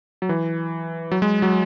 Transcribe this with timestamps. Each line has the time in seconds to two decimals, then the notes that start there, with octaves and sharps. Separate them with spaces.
0.22 F#3
0.29 E3
1.12 F#3
1.22 G#3
1.42 F#3